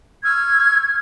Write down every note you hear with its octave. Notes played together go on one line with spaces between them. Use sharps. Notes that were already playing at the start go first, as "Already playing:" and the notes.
C#6 E6 F6 G#6